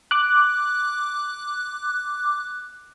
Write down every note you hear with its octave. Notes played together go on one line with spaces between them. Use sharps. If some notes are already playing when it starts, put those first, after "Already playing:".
D6 F#6